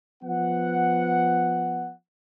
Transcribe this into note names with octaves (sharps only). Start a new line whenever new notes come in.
F3 B3 F#5